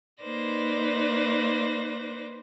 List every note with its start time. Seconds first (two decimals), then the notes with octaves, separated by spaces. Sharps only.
0.22 A#3 D#4 B4 C5 D5 A#6